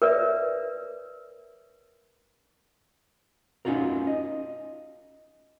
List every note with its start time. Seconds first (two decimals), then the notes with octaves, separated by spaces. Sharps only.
0.02 A#4 B4 C#5 D5 E5
3.65 C#4 D#4 F4 F#4 A#4
4.07 D#5